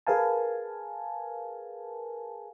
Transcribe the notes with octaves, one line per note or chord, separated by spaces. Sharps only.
G#4 A#4 B4 F5 G#5 A5